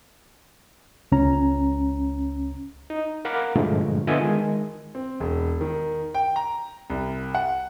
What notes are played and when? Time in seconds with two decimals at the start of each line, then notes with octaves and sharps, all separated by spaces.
1.12 C#2 C#4 A#5
2.90 D#4
3.25 A#4 F5 F#5 A#5 B5 D6
3.56 G2 A#2 D3 F3 G#3 A3
4.07 D3 B3 F4 D#5 E5 G#5
4.20 D#3 G#3 G#4
4.95 C4
5.20 E1
5.61 D#3
6.15 G5
6.36 A#5
6.90 C2
7.35 F#5